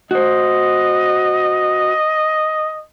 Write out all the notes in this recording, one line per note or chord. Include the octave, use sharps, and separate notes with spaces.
F#4 C5 D#5